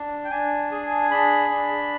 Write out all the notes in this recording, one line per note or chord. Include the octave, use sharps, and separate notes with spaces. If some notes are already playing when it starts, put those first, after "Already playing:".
Already playing: D4
G5
D4 G#5
G#4 G#5
D4 B5
D4